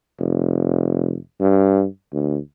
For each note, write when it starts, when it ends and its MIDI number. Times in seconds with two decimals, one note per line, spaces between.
0.19 1.17 29
1.40 1.85 43
2.13 2.38 38